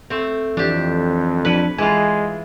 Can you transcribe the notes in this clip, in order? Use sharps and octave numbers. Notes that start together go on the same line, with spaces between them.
A3 C4
F2 E3 D4 G4
F3 D4 B4
E3 G#3 F4 G#5